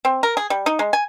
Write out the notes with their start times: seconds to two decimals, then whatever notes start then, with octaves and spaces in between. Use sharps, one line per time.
0.05 C4
0.23 A#4
0.37 G#4
0.50 G3
0.66 D#4
0.79 G#3
0.93 G#5